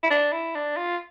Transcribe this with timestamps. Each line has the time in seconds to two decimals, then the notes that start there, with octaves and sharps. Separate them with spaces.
0.03 E4
0.11 D4
0.32 E4
0.55 D4
0.77 F4